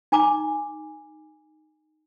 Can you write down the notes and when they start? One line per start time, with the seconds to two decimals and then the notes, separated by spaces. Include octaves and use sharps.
0.12 D#4 G#5 A#5 D6